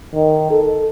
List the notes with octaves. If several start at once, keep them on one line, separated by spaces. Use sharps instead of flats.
D#3
A4